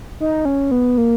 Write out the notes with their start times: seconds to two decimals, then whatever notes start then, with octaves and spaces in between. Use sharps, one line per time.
0.20 D#4
0.45 C#4
0.71 B3
0.98 A#3